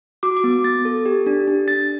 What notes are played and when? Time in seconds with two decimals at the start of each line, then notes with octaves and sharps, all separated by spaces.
0.23 F#4 D6
0.37 D6
0.44 B3
0.64 B3 A6
0.85 A4
1.06 G4
1.26 D4
1.48 D4
1.68 D4 A6